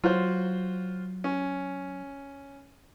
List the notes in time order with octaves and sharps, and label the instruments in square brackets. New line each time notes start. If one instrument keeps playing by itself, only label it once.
[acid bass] F#3 [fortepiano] F4 F#4 C5
[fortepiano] C#4